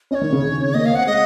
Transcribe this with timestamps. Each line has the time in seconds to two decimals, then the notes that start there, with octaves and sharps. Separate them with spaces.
0.11 C#4 D#5
0.15 C#5
0.21 D#3
0.32 C#3
0.43 C#3
0.74 A#3 D#5
0.86 F5
0.91 C4 F#5
1.06 G#3 D#5